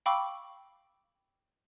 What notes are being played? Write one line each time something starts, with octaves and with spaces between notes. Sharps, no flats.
F5 G5 B5 C#6 D6 E6